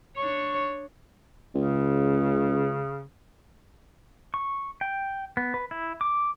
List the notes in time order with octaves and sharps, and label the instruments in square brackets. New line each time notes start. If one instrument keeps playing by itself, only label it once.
[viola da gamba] D4 C#5 [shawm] C#6
[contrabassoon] C#2 [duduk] C#3
[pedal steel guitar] C#6
G5
B3
B4
E4
D6